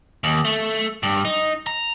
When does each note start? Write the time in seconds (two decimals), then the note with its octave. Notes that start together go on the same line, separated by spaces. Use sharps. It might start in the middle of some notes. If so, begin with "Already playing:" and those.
0.24 D#2
0.45 A3
1.03 G2
1.25 D#4
1.67 A#5